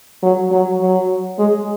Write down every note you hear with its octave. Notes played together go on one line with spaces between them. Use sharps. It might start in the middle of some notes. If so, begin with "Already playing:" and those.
F#3
F#3
F#3
G#3